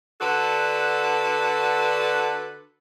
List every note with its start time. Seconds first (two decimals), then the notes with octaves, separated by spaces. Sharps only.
0.21 D3 D4 F#4 A4 B4